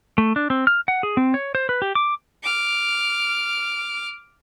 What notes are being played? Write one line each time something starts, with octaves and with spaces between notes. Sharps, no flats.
A3
D4
C4
F6
F#5
G#4
C4
C#5
C5
B4
G4
D6
D6 F6